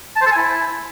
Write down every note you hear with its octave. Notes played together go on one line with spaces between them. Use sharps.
A5
C5
A4
G#5
E4